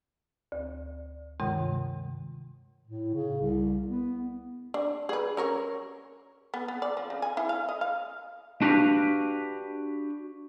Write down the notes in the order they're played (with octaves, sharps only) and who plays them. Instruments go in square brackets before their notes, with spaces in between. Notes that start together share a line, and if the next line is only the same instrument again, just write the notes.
[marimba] D2
G2 C3 D#3 G#3
[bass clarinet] A2
C#3
C2
B3
[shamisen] D4
G#4 B4
C#4 A#4 C#5
B3
B3
D5
F3
C#3
G#5
E4
F5
D#5
F5
[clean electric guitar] D4 F#4 G4 B4 F5